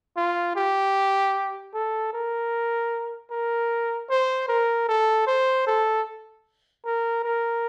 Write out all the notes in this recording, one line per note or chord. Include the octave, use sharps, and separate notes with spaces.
F4
G4
A4
A#4
A#4
C5
A#4
A4
C5
A4
A#4
A#4